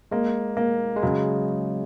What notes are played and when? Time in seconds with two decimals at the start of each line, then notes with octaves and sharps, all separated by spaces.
0.12 G#3 A#3
0.57 A#3
0.96 G#3
1.03 C#3 F#3